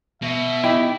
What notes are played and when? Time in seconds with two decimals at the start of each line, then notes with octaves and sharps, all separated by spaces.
0.22 B2 E5
0.64 D#4 E4 G4